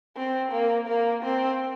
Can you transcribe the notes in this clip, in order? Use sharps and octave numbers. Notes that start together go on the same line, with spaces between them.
C4
A#3
A#3
C4